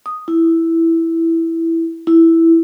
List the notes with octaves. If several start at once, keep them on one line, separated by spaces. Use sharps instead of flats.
D#6
E4
E4